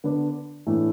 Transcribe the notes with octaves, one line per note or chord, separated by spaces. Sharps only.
D3 B3 D4
A2 E3 A3 D4